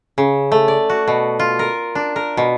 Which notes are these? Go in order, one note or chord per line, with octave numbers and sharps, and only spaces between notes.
C#3
A3
D5
F#4
B2
F4
A#4
D4
A#4
B2